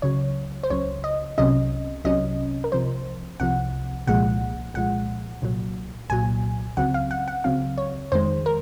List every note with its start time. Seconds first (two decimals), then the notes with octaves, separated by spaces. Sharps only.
0.02 C#2 C#3 F#3 C#5
0.63 C5
0.70 C#2 C#3 F#3 C#5
1.04 D#5
1.38 C2 C3 F#3 C#4 D#5
2.05 C2 C3 F#3 C#4 D#5
2.64 A#4
2.72 C2 C3 F3 C5
3.40 C2 C3 F3 F#5
4.07 C2 A#2 F3 G#3 F#5
4.74 C2 A#2 F3 G#3 F#5
5.42 C2 A#2 F#3
6.10 C2 A#2 F#3 G#5
6.77 C#2 C#3 F#3 C4 F#5
6.94 F5
7.11 F#5
7.28 F#5
7.44 C#2 C#3 F#3 C4 F5
7.78 C#5
8.12 F2 D#3 G#3 C5
8.46 A#4